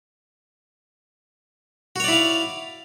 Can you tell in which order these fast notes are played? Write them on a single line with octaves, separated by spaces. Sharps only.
F#4 C#5 D5 E4 F5